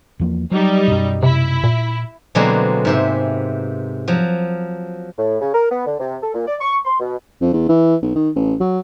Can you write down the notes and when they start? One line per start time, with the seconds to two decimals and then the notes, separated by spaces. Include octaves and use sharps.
0.19 E2 F3 A#3
0.51 F#3 G3 D#4
0.88 F#2 B2
1.23 C3 E4
1.64 A#2
2.35 B2 D3 F#3 G#3 A#3 C4
2.85 G#2 C3 E5
4.08 F3 F#3
5.18 A2
5.41 C#3
5.54 A#4
5.71 B3
5.86 D3
6.00 C3
6.22 A4
6.34 A#2
6.47 D5
6.60 C#6
6.85 C6
7.00 B2
7.41 F2
7.53 E2
7.69 E3
8.02 B1
8.15 D#3
8.35 A1
8.60 F#3